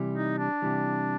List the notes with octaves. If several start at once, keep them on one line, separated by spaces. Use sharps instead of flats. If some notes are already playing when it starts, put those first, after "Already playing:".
Already playing: C3 E3 G3
D#4
D4
C3 E3 G3